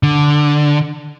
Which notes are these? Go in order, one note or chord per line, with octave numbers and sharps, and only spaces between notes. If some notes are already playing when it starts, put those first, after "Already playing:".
D3